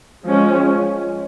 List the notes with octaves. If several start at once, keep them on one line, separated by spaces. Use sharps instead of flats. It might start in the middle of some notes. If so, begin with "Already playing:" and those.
F3 G#3 C#4